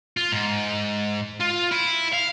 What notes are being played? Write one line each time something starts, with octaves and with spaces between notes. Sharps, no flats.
F4
G#2
F4
E4
F5